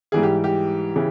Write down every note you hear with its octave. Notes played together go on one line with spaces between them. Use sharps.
G#2 E3 G3 G#4
G4
G4
C#3 E3